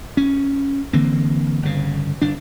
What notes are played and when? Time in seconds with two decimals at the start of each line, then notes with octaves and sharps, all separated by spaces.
0.17 C#4
0.93 D3 E3 A#3 C4
1.63 G1 C#3
2.22 G1 D4